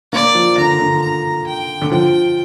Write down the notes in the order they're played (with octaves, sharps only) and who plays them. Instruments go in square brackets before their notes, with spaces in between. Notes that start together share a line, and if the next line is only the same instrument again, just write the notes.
[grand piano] A#3 [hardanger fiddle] D5
[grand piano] F3
[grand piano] D3 [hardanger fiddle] A#5
[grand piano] D3
[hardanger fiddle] A#5
G5
[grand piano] D3
[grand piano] F3 [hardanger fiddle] G5